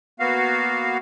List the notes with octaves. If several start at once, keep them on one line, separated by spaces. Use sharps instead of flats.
A#3 B3 F#4 F5